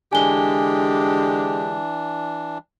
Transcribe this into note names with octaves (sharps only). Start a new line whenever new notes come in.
D3 E3 G#3 D4 G4 G#5 G7